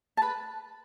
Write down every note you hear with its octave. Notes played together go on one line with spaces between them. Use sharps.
A5
B4 B5